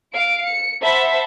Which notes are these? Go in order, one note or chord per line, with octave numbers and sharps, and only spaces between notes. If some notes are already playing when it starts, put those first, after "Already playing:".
F5 D7
C#7
C5 E5 F#5 A5 B5